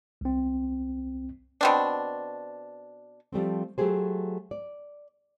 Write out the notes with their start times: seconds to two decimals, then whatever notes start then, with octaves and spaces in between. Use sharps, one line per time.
0.21 C2 C4
1.61 B2 C4 D4
3.33 F3 G3 A3 C4
3.78 F#3 A3 G4 G#4 C5
4.51 D5